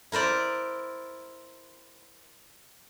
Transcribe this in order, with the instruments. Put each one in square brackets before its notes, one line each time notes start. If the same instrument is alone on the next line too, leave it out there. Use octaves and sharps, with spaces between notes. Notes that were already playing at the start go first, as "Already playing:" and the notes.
[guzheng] E4 A#4 C5 D5